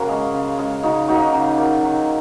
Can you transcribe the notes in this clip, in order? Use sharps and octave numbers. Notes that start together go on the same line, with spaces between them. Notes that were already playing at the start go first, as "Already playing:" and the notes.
Already playing: C#3 A#3 F#4 A#4
G#3 C#4
C#3
G#3 C#4
C#3 D#4 F#4
F#3 A#3 D#4 F#4
C#3
F#3 A#3
D#3